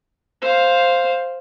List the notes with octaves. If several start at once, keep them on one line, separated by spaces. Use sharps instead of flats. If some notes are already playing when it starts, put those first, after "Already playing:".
C5 F5